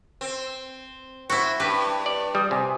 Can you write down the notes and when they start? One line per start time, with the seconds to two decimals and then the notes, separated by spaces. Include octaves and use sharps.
0.21 C4
1.30 C4 E4 F#4
1.60 G2 G4 B4
2.06 D5
2.35 G3 D#6
2.51 C3 G#5